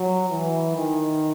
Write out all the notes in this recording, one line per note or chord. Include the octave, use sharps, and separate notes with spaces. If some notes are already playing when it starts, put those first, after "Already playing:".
Already playing: F#3
E3
D#3